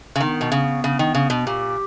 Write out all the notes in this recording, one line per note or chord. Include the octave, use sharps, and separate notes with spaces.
C#3
D#3 B3
B2
C#3
C#3
D#3
C#3
B2
A#2 G4